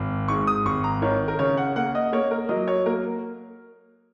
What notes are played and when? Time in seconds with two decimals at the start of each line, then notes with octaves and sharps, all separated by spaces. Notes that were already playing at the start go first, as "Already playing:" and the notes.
Already playing: G#1
0.28 G#2 C#6
0.47 D#6
0.65 G#1 C#6
0.84 A#5
1.02 D#3 C#5
1.28 A#4
1.39 C#3 C#5
1.57 F#5
1.76 A#3 F#5
1.95 D#5
2.13 A#3 C#5
2.31 A#4
2.49 F#3 D#5
2.68 C#5
2.86 A#3 A#4